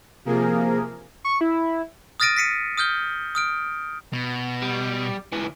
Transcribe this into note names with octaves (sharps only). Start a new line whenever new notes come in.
C3 F3 A#3 G#4 A#4
C#6
E4
D#6 F6 A6 A#6 D7 D#7
A#6 B6 C#7 D#7
D#6 F6 G6 G7
D#6 F6 D7
B2
G3
C#2 E3